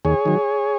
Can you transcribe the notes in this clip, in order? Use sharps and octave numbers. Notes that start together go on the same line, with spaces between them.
D#2 G#4 C#5
D#3 F#3